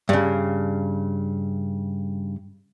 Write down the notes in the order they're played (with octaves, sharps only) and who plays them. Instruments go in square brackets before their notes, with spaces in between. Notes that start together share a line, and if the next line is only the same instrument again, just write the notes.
[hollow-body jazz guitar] G2 C#3